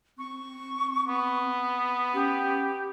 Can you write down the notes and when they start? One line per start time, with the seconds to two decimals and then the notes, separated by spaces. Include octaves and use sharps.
0.18 C4 C#6
1.08 B3
2.13 C#4 G4